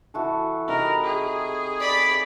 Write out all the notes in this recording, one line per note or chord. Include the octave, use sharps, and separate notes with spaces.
E3 F#4 A4
C3 D#4 A#4 B5
G#4
D5 B5